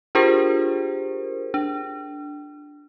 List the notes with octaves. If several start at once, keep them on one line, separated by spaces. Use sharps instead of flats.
D4 F4 G4 G#4 A#4 C5
D4